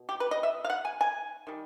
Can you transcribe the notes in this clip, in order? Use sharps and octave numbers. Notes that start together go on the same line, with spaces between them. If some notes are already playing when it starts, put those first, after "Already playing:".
Already playing: B2
G4
B4
D#5
E5
F5
F#5
G#5
G#5
D#3 G3